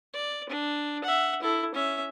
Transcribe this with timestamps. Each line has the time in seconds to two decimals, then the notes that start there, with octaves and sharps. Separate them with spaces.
0.14 D5
0.49 D4
1.04 E5 F#5
1.42 E4 A4
1.74 C#4 E5